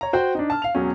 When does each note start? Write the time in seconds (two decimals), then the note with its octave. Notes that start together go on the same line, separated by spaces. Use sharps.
0.01 C#5 A#5
0.13 F#4 C5 G5
0.35 D4 D#4
0.50 A5 F6
0.62 F5 F7
0.75 E1 F#3 C#4